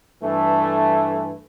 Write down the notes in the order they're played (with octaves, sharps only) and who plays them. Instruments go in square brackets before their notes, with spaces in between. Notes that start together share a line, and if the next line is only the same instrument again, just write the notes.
[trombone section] G2 E3 A3